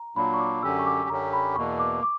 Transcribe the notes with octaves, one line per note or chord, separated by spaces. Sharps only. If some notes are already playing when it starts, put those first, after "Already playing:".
Already playing: A#5
A#2 F#3 A#3 D4 B5
C#6
D6
F#2 D3 F#3 C#4 G4 E6
C#6
D6
F#2 D3 F#3 C#4 G4 A#5
B5
E2 B2 A#3 C#6
D6
D6